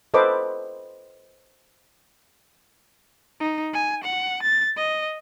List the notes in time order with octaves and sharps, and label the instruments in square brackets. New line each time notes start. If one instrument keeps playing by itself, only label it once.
[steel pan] A4 B4 C5 D#5 B5 D6
[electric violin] D#4
G#5
F#5
A6
D#5